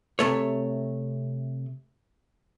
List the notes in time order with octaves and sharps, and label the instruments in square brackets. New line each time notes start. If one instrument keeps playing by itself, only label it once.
[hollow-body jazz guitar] C3 A3 C#5